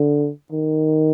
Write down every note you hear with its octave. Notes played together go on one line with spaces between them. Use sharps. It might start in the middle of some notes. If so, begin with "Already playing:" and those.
Already playing: D3
D#3